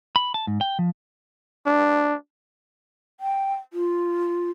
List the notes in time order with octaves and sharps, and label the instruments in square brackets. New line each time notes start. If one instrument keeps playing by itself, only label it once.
[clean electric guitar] B5
A5
G#2
G5
F3
[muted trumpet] D4
[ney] G5
F4